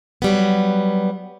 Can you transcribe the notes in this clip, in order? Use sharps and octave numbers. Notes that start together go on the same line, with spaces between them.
F#3 G3 B3